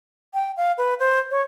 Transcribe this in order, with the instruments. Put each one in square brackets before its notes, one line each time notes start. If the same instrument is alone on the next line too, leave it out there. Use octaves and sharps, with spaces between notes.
[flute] G5
F5
B4
C5
C#5